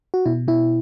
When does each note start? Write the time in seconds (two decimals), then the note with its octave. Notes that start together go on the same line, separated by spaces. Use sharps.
0.14 F#4
0.26 B2 E4
0.48 B2 E4